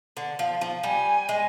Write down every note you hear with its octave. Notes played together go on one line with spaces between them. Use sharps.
D3
F3
F3
G3 G#5
G#3